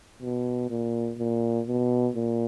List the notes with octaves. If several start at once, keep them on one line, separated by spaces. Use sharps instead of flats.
B2
A#2
A#2
B2
A#2